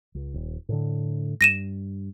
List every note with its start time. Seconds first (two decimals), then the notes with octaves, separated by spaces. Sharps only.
0.15 C#2
0.34 D#1
0.69 A2 D3
1.41 G2 A#6 D#7 E7